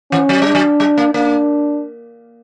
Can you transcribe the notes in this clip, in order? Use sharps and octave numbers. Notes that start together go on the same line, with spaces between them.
E3 C#4
F#3
G3 D4
F#3
G3
A#3
A#3 D4